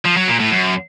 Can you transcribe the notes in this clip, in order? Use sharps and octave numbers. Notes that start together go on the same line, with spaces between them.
F3
F#3
A#2
A2
F#2